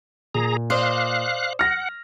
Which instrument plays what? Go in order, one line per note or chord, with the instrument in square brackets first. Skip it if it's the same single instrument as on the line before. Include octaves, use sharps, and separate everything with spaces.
[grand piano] A#2 [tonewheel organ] G#4 A#5
[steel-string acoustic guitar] C5 D5 D#5 [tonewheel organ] F5 F#6
[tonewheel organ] F#5 [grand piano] F6 A#6